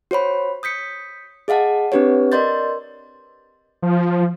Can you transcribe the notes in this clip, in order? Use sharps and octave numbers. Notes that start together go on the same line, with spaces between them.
F#4 C5 C#5 B5
D#6 G6 B6 C#7
G#4 D#5 F5 F#5 A5
C4 D4 G4 B4 C#5
A#4 D5 D#5 C6 G6 A6
F3